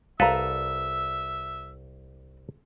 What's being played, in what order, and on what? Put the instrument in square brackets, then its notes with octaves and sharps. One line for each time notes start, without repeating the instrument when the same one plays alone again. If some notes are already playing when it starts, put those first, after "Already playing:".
[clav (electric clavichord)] C2 A4 B4 [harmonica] E5 [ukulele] F5 A#5